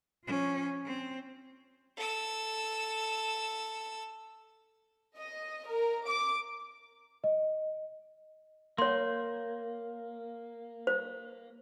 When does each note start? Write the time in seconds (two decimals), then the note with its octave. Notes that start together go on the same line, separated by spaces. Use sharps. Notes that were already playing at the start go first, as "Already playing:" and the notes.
0.25 F3 C#4
0.86 C4
1.97 A4 E6
5.16 D#5
5.65 A#4
6.05 D6
7.24 D#5
8.78 A#3 C#5 C6
10.87 C5